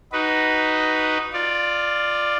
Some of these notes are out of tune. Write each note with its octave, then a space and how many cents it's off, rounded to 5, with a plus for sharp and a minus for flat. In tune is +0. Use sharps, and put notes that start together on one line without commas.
D#4 +0 F#4 +15 B4 +0
F4 +0 D5 +10